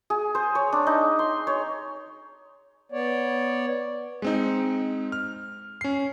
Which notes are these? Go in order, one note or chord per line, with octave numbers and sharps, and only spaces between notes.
G#4
C5
C#5
D4
D#4
C6
C#5
B3 C#5 D5
G#3 C4 D#4
F6
C#4 C7